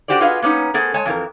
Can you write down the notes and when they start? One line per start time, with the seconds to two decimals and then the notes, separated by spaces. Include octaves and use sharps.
0.08 D4 F#4 G4 C5 D5
0.21 F4 F#4 G#4 B4 D#5 F5
0.42 A#3 B3 C#4 D#4
0.74 A3 B3 G#4 A#4 C5
0.94 G#3 C#5 G#5 A5
1.06 F2 E3 A#4